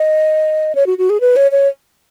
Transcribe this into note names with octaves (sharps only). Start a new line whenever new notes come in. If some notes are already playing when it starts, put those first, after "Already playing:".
Already playing: D#5
C#5
F#4
F#4
G#4
B4
C#5
C#5